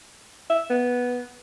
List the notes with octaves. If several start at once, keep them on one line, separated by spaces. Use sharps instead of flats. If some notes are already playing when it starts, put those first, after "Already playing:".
E5
B3